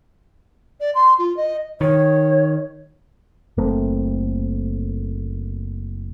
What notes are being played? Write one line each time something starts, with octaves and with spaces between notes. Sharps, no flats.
D5
C6
F4
D#5
D#3 C#5
F#1 A3 A#3 C4